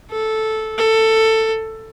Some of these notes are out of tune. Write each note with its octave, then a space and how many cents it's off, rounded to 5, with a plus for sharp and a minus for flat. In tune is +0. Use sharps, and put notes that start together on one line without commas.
A4 -5
A4 +15